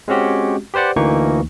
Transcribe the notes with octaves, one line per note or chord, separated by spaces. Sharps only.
G#3 C4 C#4 F#4 G4
G4 B4 C5 D5 F#5
D2 E3 A#3 D#4 C#6